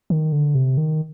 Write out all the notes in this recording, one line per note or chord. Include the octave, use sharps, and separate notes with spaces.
D#3
D3
C3
D#3